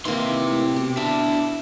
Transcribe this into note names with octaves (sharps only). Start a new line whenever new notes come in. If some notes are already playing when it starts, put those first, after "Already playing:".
C3 D#3 E3 A#3 C6
A2
B2 G4
D4 E4 E5